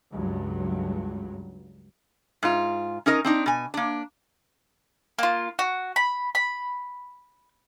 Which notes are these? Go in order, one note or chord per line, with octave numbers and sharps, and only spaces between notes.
C#2 G2 F#3
G#2 F4
C#4 D#4 A#4 D#5
C4 D4 D#4
B2 G#5
A#3 D4
A#3 F4
F#4
B5
B5